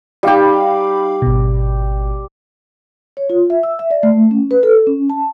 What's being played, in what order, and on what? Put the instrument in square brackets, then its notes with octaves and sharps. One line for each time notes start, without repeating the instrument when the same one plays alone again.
[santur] G3 G4 [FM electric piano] D#4 F5 B5
[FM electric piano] G#1 B2
[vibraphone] C#5
F4
E5
E6
E5
D5
A3
C#4
B4
A4
C#4
A5